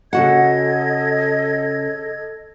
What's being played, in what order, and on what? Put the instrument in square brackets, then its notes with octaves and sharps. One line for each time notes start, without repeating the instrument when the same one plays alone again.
[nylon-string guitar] C#3 F#4 F#5 [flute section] A4 D#5 G#6